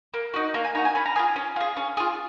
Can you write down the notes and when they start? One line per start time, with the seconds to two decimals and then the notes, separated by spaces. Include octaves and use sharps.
0.14 A#3
0.34 D#4 F#4
0.54 A#3 A#5
0.64 G#5
0.75 D#4 F#4 A#5
0.85 G#5
0.95 C#4 B5
1.06 A#5
1.16 F4 G#4 G#5
1.36 C#4
1.56 F4 G#4
1.77 C#4
1.97 F4 G#4